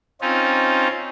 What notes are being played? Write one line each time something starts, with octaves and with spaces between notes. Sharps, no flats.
C4 C#4 D#4 F4